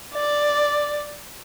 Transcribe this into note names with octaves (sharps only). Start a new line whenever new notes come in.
D5